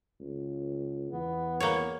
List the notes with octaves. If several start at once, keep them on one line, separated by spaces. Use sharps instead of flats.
C#2
E2 B3
A#3 C#5